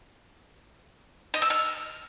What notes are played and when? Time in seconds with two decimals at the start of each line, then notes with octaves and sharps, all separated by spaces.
1.34 D#5
1.42 E6
1.50 F6